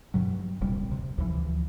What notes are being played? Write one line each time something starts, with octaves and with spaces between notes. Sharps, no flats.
G2 B2 F#3
D1 A#1 C3 G3
C3
D2 E3 F3